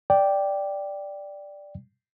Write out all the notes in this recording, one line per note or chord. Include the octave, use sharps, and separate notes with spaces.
D5 G5